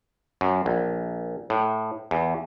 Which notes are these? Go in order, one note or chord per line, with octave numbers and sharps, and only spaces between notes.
F#2
A#1
A2
E2